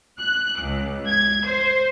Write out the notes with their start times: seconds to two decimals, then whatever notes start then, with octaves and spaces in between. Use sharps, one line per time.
0.19 F#6
0.60 C#2
1.08 G#6
1.45 C5